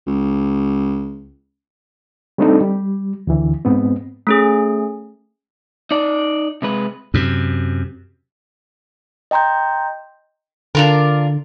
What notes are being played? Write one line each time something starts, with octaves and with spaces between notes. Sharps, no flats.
C#2
G3 A3 C4 D4 D#4 A4
G3
D2 D3 E3
G#2 B3 C4
A3 C#4 G#4
D#4 D5
C3 G#3 B4
F#2 C3
D#5 G5 A#5 C6 G6
D3 D4 F4 A#4